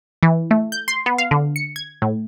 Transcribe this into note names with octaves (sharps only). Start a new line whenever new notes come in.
E3
A3
G6
C6
B3
F5
D3
C#7
G#6
A2